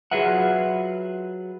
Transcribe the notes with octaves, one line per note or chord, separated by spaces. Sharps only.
F#3 F4 G#4 B4 E5 F#5